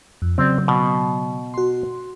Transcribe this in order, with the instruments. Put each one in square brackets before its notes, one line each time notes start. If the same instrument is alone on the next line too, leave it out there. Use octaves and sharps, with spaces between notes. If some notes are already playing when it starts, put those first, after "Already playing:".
[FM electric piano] F2
[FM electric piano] C#3 F#3 [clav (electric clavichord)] C4 D5
[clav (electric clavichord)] B2
[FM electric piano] F#4 C6